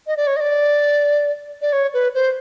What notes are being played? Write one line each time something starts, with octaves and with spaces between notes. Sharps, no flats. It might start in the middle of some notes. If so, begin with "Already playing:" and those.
D#5
D5
C#5
D#5
D5
D5
C#5
B4
C5